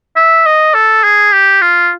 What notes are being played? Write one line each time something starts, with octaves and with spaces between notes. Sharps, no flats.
E5
D#5
A4
G#4
G4
F4